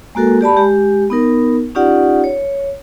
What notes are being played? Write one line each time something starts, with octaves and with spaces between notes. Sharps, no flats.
G#3 A#3 F#4 A4 A#4
G4 D5 A5 B5
G#3 G4
B3 D#4 A#4
C#4 D#4 F4 G4 D5 F#5
C#5